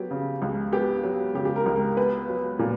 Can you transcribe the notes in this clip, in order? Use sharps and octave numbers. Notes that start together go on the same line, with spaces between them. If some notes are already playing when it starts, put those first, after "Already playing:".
Already playing: F#3 B3 G4
C#3
C#2
B3 G4
F#3
C#3 G4
G4
A#4
C#2
A#4
B3 B4
F#3
A#2